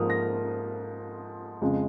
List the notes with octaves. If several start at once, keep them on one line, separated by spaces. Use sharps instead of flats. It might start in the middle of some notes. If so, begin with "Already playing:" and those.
Already playing: G#2 F3 A#3 D#6 F6
A#6
F2 C#3 G#3